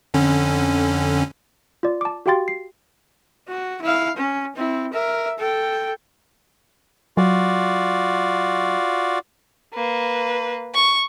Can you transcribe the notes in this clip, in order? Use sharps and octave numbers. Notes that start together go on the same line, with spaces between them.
F2 D3 C#4
F4 D5
A5 D6
F#4 G4 F5 G5 C6 A6
C7
F#4
E4 F5
C#4
C4 E4
A#4 E5
A4 G5
F#3 F4 F#4 D5
A#3 B4
C#6